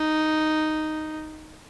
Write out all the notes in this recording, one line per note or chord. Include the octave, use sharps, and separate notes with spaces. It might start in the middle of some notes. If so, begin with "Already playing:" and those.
Already playing: D#4